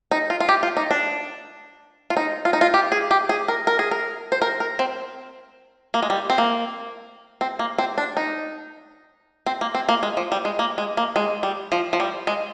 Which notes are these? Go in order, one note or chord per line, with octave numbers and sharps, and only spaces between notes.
D#4
F4
F4
G4
F4
D#4
D4
F4
D#4
F4
D#4
F4
G4
G#4
G4
G#4
A#4
A#4
G#4
A#4
C5
A#4
A#4
C4
A#3
G#3
G3
C4
A#3
C4
A#3
C4
D4
D#4
C4
A#3
C4
A#3
G#3
F3
G3
G#3
A#3
G#3
A#3
G#3
G3
F3
F3
G3
G#3